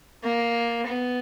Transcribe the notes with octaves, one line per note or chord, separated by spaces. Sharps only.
A#3
B3